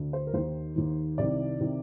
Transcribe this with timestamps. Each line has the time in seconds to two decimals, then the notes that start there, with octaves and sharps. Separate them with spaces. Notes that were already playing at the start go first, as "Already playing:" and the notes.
Already playing: D2 D3
0.13 C5
0.27 A#4
0.34 D#2 D#3 C5
0.76 D#2 D#3
1.18 C2 C3 D#3 D5
1.61 C3 D#3